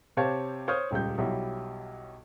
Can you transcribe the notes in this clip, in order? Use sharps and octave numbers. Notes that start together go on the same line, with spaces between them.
C3 G4 C5 C#5 F5 A5
C5 C#5 D#6 F6 G6
D#1 C#2 G3 G6
B1 F#3 G3 E4